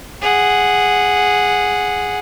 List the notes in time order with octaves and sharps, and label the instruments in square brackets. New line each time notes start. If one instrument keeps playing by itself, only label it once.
[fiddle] G#4 F#5